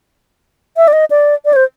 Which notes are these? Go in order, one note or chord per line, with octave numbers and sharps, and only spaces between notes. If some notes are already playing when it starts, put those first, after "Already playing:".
E5
D5
D#5
D5
D5
C#5
C5